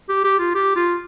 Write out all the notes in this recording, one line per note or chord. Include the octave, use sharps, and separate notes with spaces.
G4
G4
F4
G4
F4